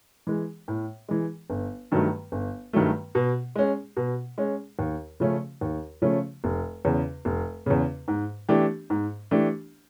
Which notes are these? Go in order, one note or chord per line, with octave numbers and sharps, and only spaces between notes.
E3 G#3
A2
E3 G#3
G1
G2 D#3 F#3 A3
G1
G2 D#3 F#3 A3
B2
G#3 C#4
B2
G#3 C#4
D#2
C#3 F3 A3 C#4
D#2
C#3 F3 A3 C#4
F1
E2 C#3
F1
E2 C#3
G#2
E3 A3 D4 G4
G#2
E3 A3 D4 G4